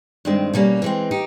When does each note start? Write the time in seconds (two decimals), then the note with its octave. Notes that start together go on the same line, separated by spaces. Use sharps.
0.25 G2 D#3 G#3 C4
0.54 B2 G3 A#3 C#4
0.82 E3 G#3 C4
1.11 D#4 G4